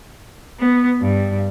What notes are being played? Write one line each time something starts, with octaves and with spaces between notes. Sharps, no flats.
B3
G2